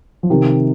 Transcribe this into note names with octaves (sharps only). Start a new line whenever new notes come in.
F3
C3 D#3